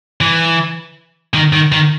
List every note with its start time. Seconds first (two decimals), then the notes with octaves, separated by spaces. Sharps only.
0.21 E3
1.34 D#3
1.53 D#3
1.72 D#3